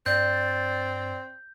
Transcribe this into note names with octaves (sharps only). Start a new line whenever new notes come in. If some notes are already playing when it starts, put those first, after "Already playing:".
G2 C4 D5 G6